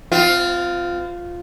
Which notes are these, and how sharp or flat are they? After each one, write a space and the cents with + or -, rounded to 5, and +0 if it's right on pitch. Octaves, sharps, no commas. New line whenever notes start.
C4 -35 F4 +0